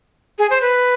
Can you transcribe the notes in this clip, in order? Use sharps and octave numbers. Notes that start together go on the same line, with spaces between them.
G#4
C5
B4